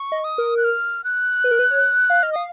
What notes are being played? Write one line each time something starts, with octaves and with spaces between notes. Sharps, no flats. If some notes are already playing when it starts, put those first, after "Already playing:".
Already playing: C#6
D#5
D#6
A#4
F#6
F6
F#6
B4
A#4
B4
C#5
F5
D#5 F6
F5 D#6